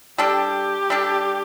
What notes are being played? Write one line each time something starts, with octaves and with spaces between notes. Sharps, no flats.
G3 D4 G4 A4
G3 D4 A4